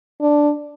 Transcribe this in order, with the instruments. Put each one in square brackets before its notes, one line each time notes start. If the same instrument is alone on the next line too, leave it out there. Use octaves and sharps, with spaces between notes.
[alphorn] D4